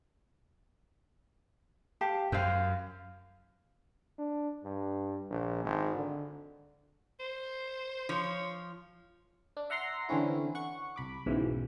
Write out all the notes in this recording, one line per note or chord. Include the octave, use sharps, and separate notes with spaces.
G4 F5 A5
F#2 C5 F5
D4
G2
A#1
G#1
D3
C5
F3 C#5
D4
E5 F#5 A#5 C6 A#6 C7
D3 E3 C4 C#4 E4
F#5 C#6
C2 B5 D6
B1 G#2 C#3 E3 F#3